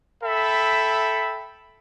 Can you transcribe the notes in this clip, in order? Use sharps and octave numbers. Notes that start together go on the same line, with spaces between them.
A4 E5 G5 B5